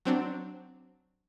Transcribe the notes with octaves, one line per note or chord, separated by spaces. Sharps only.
F#3 C4 D4